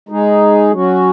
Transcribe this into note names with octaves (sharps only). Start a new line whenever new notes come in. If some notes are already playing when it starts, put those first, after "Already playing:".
G#3 D#4 G#4
F#3 C#4 F#4